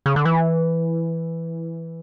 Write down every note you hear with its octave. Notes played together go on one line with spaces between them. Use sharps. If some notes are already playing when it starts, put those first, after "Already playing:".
C#3
D3
E3